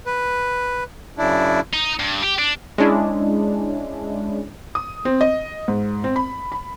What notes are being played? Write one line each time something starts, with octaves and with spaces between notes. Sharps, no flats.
B4
F#2 C#3 D4 E4
D#4
G2
G4
D4
G#3 C#4 D4 E4
D#6
C4
D#5
G#2
C4
B5
B5